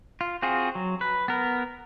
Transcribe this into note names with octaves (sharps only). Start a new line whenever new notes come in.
F4
C4 F4 F#4 G#4
F#3
B4
B3 A#4